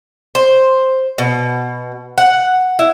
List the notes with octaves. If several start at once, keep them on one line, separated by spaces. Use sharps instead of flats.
C5
B2
F#5
E4